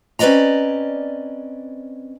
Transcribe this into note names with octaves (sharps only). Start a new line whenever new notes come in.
C4 C#4 B4 D5 D#5 A#5